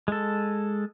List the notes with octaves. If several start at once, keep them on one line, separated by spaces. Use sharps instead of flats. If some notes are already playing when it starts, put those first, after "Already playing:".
G#3 A4